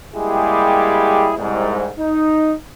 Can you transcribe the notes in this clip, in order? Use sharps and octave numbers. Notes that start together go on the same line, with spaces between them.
G3 G#3 A#3 E4 G4 G#4
C2 G#2
D#4